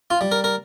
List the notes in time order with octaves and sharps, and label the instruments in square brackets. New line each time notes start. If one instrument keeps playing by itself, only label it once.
[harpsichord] F4
G3
A#4
A#4